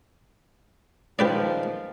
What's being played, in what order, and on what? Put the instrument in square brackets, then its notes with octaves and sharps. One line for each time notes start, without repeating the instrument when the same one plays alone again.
[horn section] G#2 D#3 F3 [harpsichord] G4 B4 D5